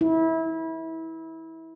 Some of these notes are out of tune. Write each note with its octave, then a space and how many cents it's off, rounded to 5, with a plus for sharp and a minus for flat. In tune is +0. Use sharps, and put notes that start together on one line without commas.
E4 -25